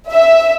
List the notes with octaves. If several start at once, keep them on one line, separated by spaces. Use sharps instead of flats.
E5